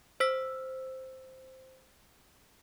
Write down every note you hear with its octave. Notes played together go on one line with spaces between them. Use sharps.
C5 E6 B6